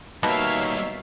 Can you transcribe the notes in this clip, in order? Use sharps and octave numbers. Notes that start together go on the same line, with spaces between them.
B2 G3 A#3 D#4 C#5 E5 F5